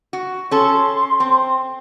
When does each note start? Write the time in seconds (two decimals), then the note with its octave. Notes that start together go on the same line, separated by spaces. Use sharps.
0.13 F#4
0.51 C#4 A4 C6
1.20 C4